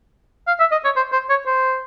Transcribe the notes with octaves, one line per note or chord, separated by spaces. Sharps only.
F5
E5
D#5
C#5
C5
C5
C#5
C5